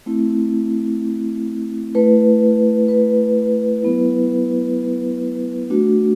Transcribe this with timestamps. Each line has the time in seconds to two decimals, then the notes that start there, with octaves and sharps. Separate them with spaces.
0.06 A3 C4 E4
1.94 A3 E4 B4
2.88 B4
3.82 F#3 B3 E4
5.70 A3 D4 F#4